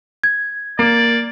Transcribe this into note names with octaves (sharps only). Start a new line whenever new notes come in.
G#6
A#3 D5